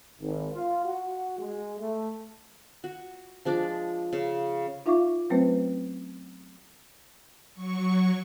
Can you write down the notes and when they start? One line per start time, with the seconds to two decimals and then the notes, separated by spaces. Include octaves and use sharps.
0.20 G#1
0.53 F4
0.85 F#4
1.39 G#3
1.80 A3
2.84 F#4
3.45 F3 G#3 D4 D5
4.13 C#3
4.86 D#4 F4 E5 F5 C#6 D6
5.30 F#3 A3 C4 C#4 B4 C5
7.54 F#3 C#6